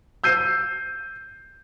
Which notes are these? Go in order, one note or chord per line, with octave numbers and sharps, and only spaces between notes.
E6 G6 C7 D#7